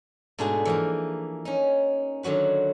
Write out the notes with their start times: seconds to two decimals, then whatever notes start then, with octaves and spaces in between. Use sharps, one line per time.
0.39 G#2 B2 A3 D4 F#4 G#4
0.65 E3 F3 A#3
1.45 C#4 D#4
2.23 D3 D#3 F#3 F#4 B4